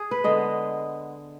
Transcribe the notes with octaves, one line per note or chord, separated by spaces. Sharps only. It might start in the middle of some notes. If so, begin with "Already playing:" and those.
Already playing: G#4
B4
D3 G#3 B3 D#5